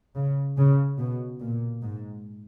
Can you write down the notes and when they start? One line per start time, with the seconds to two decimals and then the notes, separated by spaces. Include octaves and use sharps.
0.15 C#3
0.57 C#3
0.99 B2
1.40 A#2
1.82 G#2